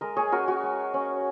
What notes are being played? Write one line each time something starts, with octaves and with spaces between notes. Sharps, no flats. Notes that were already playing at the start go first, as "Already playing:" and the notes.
G#3 A#4 D#5
G#4 C#5
C#4 F#4 A#4
F#4
G#3
C#4